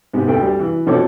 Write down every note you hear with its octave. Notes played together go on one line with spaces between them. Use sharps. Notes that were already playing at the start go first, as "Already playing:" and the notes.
G#2 C3 B3
D2 A3 G5
G3
E3
B2 F3 C4 A4 C#5 D6